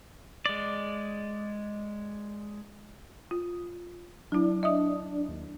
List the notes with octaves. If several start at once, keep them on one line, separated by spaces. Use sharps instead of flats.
G#3 D5
F4
F#3 D4 E4
D#5 E5 D#6
D#2